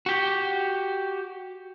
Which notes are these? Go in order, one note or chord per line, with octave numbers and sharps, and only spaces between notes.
F#4 G4